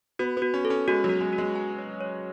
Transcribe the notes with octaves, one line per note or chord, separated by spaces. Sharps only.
B3 F#4
B3
F#4
C#4
A4
C#4
G#3 F#4
F#3
F#4
G#3
F#4
G#3
G#5
C#5
C#5